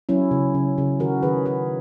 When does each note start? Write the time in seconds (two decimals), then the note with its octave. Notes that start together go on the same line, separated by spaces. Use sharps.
0.09 F#3 C#4 E4
0.31 C#3
0.54 C#3
0.78 C#3
1.00 D#3 F#4 A#4
1.22 D#3 G#4 B4
1.46 D#3 G#4 B4